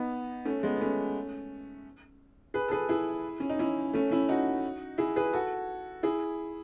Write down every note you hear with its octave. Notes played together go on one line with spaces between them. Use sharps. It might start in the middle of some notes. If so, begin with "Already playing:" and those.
Already playing: B3 D#4
A3 C#4
G#3 B3
B3
A3 C#4
G#4 B4
A4
G#4 B4
E4 G#4
C#4
D#4
C#4 E4
A3 C#4
C#4 E4
D#4 F#4
E4 G#4
G#4 B4
F#4 A4
E4 G#4